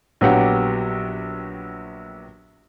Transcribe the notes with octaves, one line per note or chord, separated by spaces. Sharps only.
A#1 F#3 B3 G4 F#5